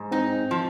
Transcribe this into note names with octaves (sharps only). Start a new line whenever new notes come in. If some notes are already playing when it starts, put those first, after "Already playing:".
Already playing: G#2
C4 D#4
F3